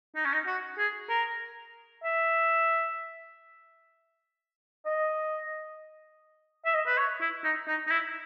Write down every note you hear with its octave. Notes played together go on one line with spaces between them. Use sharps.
D#4
C#4
D#4
F#4
G#4
A#4
E5
D#5
E5
D#5
B4
C#5
E4
D#4
D#4
D#4
E4